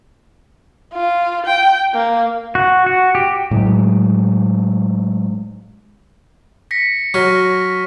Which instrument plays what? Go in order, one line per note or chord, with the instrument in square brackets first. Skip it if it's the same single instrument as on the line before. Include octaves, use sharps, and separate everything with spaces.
[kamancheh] F4
G5
A#3
[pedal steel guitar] F#4
F#4
G4
[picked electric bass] A2 F#3 G#3
[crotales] A#6 B6 C#7
[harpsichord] F#3 [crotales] C#6 F6 B6